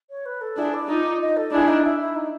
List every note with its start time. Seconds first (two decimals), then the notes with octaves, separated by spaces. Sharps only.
0.09 C#5
0.25 B4
0.41 A4
0.57 D4 E4 G#4
0.73 D5
0.89 D#4 F4
1.20 D#5
1.36 A4
1.52 D4 E4 G#4
1.67 D#4
1.84 E4
2.00 E4
2.15 D#4